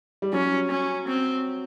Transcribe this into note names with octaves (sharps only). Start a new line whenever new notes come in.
G3
F#3 C#4
C#4
C4